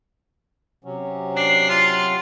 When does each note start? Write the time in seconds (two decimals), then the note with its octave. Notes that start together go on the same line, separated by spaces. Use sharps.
0.85 C3 F#3 C#4
1.37 D4 C7
1.69 F4